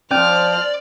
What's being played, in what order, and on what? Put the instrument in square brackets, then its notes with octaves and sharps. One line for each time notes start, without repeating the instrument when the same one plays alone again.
[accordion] F3 [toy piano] C#4 [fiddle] C5 F6 [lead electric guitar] D5